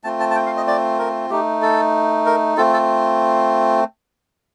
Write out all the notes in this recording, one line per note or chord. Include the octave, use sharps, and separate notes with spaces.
A3 C4 F4 A5
A5
A5
G5
F5
D#5
D5
A#4
A3 D#4 G4
A4
A#4
A3 C4 F4 A4
A4